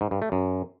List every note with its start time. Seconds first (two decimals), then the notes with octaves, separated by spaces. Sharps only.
0.01 G#2
0.11 G2
0.22 A3
0.32 F#2